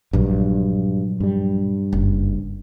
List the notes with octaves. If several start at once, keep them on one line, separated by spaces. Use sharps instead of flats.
A#1 G2 F#3
G2 G3
F#1